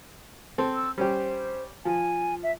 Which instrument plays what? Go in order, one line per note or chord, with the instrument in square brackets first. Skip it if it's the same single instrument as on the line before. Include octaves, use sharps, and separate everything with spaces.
[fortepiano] C4 A4
[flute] E6
[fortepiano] G3 C#4 G4 [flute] C5
[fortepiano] F3 [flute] G#5
[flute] E5